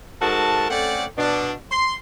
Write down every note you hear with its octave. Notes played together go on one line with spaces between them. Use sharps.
G#2 F#4 A4 A#4 A5
A3 C4 C#4 A4 D5 F#5
B2 D4
C6